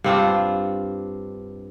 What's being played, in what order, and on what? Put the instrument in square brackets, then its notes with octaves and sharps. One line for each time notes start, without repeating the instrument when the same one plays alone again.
[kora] G2 C4 D4 F4